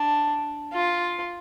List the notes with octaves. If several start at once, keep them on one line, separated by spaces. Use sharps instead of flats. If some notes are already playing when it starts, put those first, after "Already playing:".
Already playing: D4
F4